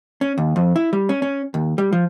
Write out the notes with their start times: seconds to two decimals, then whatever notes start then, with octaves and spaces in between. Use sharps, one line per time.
0.21 C#4
0.38 D#2
0.56 F2
0.76 E4
0.93 G3
1.09 C#4
1.22 C#4
1.54 D#2
1.78 G3
1.93 F3